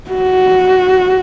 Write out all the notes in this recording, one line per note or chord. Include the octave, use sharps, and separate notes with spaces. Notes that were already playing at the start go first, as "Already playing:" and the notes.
F#4